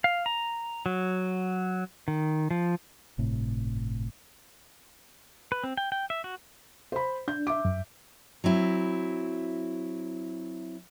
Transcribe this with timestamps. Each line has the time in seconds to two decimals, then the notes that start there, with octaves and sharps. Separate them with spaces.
0.04 F5
0.26 A#5
0.86 F#3
2.08 D#3
2.51 F3
3.18 G1 A2 C3
5.52 B4
5.64 C4
5.77 G5
5.92 G5
6.10 E5
6.24 F#4
6.92 C5 B5
7.28 D4 G6
7.47 E5 D6
7.65 F#2
8.44 F#3 C4 E4